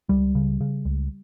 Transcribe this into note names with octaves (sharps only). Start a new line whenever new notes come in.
C#2 G3
C#3
C#3
C#2